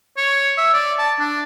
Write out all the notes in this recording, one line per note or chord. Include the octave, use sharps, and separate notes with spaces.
C#5
E5
D5
A5
D4